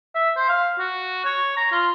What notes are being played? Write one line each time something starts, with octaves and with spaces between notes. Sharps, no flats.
E5
C5
F5
F#4
C#5
A#5
F4